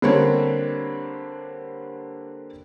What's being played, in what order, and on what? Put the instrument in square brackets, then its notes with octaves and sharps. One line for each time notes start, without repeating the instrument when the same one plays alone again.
[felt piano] D3 G3 A#3 C4 D4 C#5